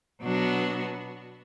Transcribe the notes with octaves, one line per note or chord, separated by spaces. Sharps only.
B2 F#3 B3 D4 F#4